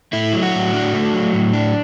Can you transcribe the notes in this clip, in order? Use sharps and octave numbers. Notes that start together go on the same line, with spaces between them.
A3 E4
F#3
F#4
A2
D4
A3
F#3
A2
D4